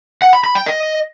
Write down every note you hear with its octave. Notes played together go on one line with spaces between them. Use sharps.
F#5
B5
B5
G5
D#5